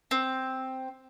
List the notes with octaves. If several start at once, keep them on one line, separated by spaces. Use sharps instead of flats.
C4